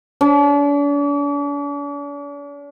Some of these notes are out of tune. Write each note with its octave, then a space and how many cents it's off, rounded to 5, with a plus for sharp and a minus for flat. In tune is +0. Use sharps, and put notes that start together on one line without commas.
D4 -45